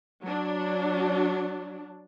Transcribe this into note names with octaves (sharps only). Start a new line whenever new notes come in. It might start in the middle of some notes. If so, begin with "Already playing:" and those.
F#3 D4